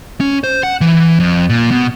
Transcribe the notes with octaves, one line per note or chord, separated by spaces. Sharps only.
C#4
C5
F#5
E3
F2
A#2
B2